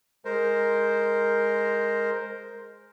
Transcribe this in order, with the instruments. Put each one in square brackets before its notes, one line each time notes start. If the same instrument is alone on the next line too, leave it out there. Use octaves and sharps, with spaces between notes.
[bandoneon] G#3 A#4 C5